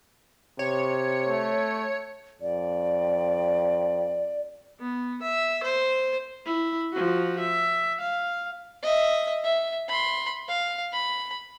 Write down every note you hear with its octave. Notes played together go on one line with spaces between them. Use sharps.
C3 C#5
A3
F2 D5
B3
E5
C5
E4
F3 F#4
E5
F5
D#5 E5
E5
B5 C6
F5
B5